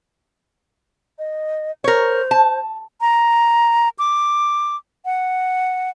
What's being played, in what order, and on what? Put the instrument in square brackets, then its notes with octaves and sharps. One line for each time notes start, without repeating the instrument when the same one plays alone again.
[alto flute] D#5
[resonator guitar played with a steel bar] A#4 C#5 [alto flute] C5
[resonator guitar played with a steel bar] A5
[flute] A#5
D6
F#5